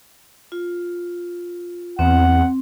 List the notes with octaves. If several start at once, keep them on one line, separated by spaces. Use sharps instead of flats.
F4
E2 C4 F#5